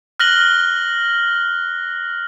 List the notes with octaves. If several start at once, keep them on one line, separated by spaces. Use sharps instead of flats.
F6 F#6 A#6 F#7 G7